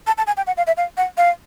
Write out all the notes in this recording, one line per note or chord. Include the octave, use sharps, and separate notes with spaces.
A5
A5
G#5
G5
F#5
F5
E5
F5
F#5
F5